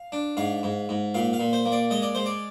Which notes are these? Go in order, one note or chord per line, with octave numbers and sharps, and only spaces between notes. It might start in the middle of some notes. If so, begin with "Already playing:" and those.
Already playing: F5
D4
G#2 F5
G#2
G#2
A#2 F5
F5
A#2
C5
A#3
D5
G#3 D#5
D5
G#3 C5
D5